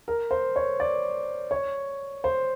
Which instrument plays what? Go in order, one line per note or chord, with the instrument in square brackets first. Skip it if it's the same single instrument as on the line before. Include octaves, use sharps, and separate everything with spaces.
[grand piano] A#4
C5
C#5
D5
C#5
C5